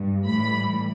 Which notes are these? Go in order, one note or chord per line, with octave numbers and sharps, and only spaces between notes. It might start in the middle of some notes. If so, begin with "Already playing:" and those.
Already playing: G2
A2 E3 G3 B5